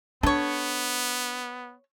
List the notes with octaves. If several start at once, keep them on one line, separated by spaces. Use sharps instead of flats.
B3 D4 A4 C#5